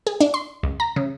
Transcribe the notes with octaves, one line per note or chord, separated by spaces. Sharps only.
G#4
D4
C6
C#2
A#5
C#3